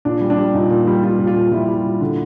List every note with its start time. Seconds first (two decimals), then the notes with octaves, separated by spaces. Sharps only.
0.05 A#2 D4
0.21 G3
0.30 D4
0.38 G3
0.54 A#2 D#4
0.70 A#2
0.87 G3
1.03 G3 F4
1.19 A#2
1.27 F4
1.35 A#2
1.52 G3 E4
1.68 G3
1.85 A#2
2.01 D3